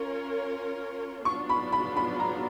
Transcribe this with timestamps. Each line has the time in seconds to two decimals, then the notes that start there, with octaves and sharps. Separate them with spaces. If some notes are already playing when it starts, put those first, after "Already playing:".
Already playing: C#4 F4 A#4 C#5
1.25 F#3 B3 D4 F4 C#6
1.49 B5
1.72 B5
1.97 B5
2.20 A#5